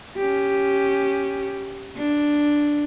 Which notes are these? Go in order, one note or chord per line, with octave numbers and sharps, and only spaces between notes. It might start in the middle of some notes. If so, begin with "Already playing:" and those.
C#4 G4
D4